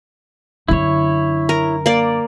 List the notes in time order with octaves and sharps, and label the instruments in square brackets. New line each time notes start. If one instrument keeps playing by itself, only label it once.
[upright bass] F#2 D3 [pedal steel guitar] E4 C#5
[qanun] A#4
A#3 D5